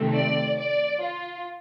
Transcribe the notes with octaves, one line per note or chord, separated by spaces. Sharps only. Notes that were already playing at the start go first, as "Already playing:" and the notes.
Already playing: C3 D#3 A3 C4
D5
D5
F4